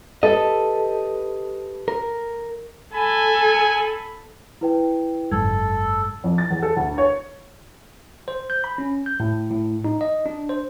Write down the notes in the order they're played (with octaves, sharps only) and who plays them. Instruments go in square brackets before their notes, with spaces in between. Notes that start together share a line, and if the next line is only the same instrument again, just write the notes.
[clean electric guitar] G4 B4 D#5 [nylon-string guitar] A4
[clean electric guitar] A#4
[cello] A4 [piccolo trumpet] G#5 [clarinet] B5
[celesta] E4 B4 G5
[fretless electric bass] F#1 G#2 [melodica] A4 [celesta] G#6
[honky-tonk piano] F2
A6
E2
A4
D2
C#5
[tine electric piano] C5
G6
B5
C#4
G6
A2
A2
D#4
D#5
D4
C5